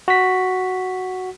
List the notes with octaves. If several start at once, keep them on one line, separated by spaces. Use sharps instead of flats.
F#4 B6